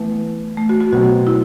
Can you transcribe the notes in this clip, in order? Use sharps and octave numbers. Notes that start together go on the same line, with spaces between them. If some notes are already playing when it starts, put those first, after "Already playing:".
Already playing: E3 A3 B3
A3
F#4
F#4
B2 F#3 C4 F#4
E4